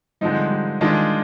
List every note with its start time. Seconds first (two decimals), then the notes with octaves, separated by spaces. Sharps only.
0.21 D3 F3 G3 G#3 C4 D#4
0.36 G3
0.51 G3
0.81 D#3 G#3 D4 F4